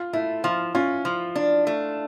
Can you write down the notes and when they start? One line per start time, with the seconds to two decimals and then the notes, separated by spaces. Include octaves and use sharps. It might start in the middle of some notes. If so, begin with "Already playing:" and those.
Already playing: F4
0.13 A3 E4
0.44 F3 F4
0.75 C#4 F4
1.05 F3
1.36 D4
1.67 A3